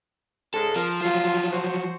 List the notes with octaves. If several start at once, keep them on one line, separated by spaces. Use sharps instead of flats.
G#2 C#3 G#3 A4
F3 A#4
F3 F#3 F4
F#4 C5